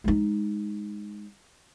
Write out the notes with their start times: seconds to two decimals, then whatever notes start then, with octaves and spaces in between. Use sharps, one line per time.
0.04 G#3 D#4